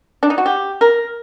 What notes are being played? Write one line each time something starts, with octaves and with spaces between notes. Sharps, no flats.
D4
D#4
F#4
G4
A#4